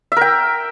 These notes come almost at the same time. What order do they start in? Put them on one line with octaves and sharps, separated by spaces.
E5 A#4 G5